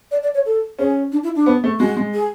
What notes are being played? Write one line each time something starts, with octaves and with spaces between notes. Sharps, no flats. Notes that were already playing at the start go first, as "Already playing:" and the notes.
D5
D5
C#5
A4
C#4 G#4
D4
E4
D4
B3
A3
G#3 F#4
G#3
G#4